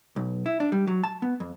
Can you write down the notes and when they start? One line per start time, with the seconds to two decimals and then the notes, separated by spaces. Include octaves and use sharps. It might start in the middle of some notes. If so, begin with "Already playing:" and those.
0.16 B1
0.46 E4
0.60 D4
0.72 G3
0.87 F#3
1.04 A5
1.22 B3
1.40 F2